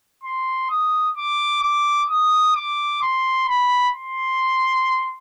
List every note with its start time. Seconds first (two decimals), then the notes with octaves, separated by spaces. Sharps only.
0.23 C6
0.70 D#6
1.17 D6
1.62 D6
2.10 D#6
2.56 D6
3.03 C6
3.48 B5
3.95 C6